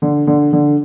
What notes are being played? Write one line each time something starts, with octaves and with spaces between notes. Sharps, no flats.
D3
D3
D3